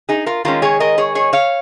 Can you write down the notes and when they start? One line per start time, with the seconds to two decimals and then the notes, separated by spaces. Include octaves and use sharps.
0.09 D#4 G#4
0.26 F4 A#4
0.45 D#3 G#3 C#4 F4 A#4
0.62 G#4 C#5
0.80 A#4 D#5
0.98 G#4 C#5
1.15 G#4 C#5
1.33 C#5 F5